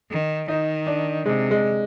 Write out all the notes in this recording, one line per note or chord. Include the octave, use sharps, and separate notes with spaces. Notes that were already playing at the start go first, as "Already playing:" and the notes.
D#3
D#3 D#4
D4
C3 G#3
G#3